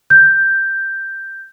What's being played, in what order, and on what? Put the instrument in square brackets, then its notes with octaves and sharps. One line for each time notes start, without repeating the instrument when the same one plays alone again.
[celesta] G6